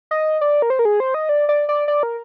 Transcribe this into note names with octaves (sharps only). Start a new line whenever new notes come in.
D#5
D5
A#4
C5
A#4
G#4
C5
D#5
D5
D5
D5
D5
A#4